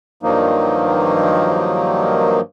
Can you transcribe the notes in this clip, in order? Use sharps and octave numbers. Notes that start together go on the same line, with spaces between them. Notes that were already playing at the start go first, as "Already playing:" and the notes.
G2 D#3 F3 F#3 A#3 D#4